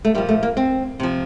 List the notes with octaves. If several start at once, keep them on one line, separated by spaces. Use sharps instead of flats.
A3
A#2 F3 G3
A3
A#3
C4
C3 F3